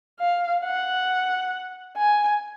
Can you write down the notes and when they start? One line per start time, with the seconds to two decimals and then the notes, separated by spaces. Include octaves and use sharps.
0.20 F5
0.64 F#5
1.97 G#5